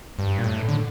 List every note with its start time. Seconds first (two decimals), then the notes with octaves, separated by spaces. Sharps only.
0.19 G2
0.38 A#2
0.44 A2
0.69 D3